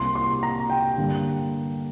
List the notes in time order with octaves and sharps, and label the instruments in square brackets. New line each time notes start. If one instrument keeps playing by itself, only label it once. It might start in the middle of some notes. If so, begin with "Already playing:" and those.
Already playing: [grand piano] C2 C3 A#3 C6
C6
A#5
G5
G2 D3 G3 A#3